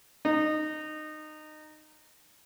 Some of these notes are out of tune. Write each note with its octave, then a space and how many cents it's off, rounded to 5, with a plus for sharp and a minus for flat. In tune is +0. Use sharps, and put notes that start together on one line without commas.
D#4 -20